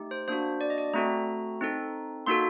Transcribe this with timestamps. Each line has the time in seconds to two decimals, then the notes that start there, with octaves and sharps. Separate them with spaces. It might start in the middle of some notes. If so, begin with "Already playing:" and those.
Already playing: A3 D#4 G4
0.11 C5
0.28 A#3 D4 F#4 C5
0.61 D5
0.70 D#5
0.78 D5
0.94 A3 C4 F#4 A4 A#5
1.61 C4 D#4 A4
2.26 A#3 D#4 F#4 A4 C6